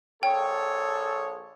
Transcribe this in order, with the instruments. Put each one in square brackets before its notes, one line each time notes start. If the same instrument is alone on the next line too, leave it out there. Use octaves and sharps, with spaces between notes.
[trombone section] A#1 G#4 A4 [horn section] C#5 [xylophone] G5